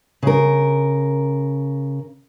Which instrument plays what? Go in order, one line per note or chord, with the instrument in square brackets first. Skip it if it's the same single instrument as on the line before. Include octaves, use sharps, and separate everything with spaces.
[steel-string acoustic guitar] C#3 A#4